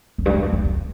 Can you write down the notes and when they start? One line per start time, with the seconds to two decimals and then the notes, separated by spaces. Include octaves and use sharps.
0.18 F2
0.26 G2
0.34 G#2
0.42 F#2
0.53 F2
0.65 E2